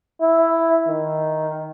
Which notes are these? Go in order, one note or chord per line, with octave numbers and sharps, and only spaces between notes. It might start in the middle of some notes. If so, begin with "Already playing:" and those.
E4
D#3